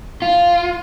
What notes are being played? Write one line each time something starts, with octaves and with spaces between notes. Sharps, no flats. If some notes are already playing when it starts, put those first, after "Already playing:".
F4